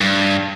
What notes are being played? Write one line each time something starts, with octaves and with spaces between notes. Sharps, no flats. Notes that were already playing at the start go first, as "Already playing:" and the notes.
G2